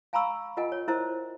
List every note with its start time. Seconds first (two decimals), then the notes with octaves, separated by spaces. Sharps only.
0.13 F5 G#5 A#5 B5 C#6 E6
0.57 F4 A#4 D#5 F#5 G#5
0.72 C#5
0.88 E4 A#4 C5 E5 A5